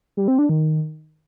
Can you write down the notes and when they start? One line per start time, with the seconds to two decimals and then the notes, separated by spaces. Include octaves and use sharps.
0.17 G3
0.28 C4
0.39 D4
0.49 D#3